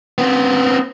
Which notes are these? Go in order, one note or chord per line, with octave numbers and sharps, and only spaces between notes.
B3 C4